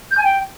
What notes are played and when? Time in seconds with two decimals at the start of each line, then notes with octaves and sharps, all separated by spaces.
0.11 G6
0.18 G#5
0.24 G5